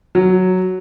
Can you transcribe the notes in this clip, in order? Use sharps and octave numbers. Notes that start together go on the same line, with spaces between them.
F#3